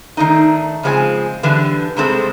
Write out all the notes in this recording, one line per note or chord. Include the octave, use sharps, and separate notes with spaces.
D#3 A3 D4 D#4
C#3 F3 G#3 C4 C#5 G#5
D3 E3 G3 B3 D4 B4
C3 G3 G#3 C4 A4